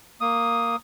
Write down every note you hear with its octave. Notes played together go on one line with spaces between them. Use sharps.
A#3 D#6